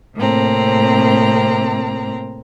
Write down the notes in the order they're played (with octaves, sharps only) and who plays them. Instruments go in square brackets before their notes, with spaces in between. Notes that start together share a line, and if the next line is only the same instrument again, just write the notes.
[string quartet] A2 C3 A#3 C4 A#5